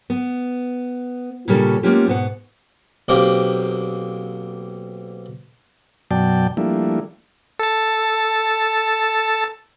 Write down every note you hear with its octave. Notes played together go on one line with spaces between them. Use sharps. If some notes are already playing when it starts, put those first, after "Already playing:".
B3
A#2 C#3 G3 C#4 D4 A4
G#3 A#3 B3 C#4 F4 G4
G#2 B2 B3 F#5
B1 A#3 C4 G4 G5
F#2 B2 F#3 D5 G5 A5
F3 G3 A3 A#3 D4 E4
A4 A5